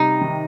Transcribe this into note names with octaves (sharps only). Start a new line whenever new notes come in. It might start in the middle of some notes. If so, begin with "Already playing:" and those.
Already playing: C3 G3 D#4
D#3